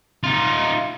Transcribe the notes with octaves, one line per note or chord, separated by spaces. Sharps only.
D#4 F4